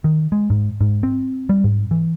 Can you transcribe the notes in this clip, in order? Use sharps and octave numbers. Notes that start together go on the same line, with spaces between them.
D#3
G#3
G#2
G#2
C4
G3
G#2
E3